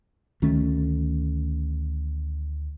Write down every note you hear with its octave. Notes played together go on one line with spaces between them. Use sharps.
D2 D#3 A3 C#4